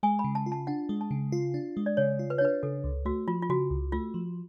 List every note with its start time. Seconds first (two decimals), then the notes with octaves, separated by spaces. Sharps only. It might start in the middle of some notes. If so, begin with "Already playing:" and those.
0.03 G#3 G#5
0.19 B5
0.24 C#3
0.35 A5
0.46 F4
0.52 A5
0.67 D4 F#5
0.89 G#3
1.01 A5
1.11 C#3
1.32 F4
1.54 D4
1.77 G#3
1.86 D5
1.97 C#3 C#5
2.19 F4
2.30 B4
2.38 C#5
2.41 D4 B4
2.63 C#3 A4
2.84 C#2
3.05 A3 F#4
3.28 F3 F4
3.42 F4
3.49 C#3 F#4
3.71 C#2
3.92 A3 F4
4.14 F3